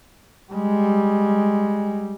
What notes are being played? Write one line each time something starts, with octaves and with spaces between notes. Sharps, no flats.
G3 G#3